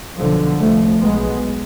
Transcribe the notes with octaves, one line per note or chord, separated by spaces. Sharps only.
B1 B2 D3 F3
C2 C3 F3 A3
B1 B2 G#3 B3